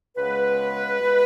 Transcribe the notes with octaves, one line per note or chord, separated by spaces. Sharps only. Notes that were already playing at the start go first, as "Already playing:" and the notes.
C#2 C#3 G#3 B3 B4
C#2 B2 G#3